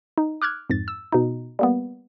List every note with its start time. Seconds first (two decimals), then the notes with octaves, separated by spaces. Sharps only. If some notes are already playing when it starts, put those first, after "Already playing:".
0.18 D#4
0.42 D6 F6 F#6 G#6
0.70 F2 G#2 A6
0.88 E6
1.12 B2 D#4
1.59 G3 A#3 B3